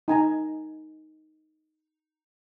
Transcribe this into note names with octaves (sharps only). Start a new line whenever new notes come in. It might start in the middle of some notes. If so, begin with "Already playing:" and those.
D#4 G#5 A#5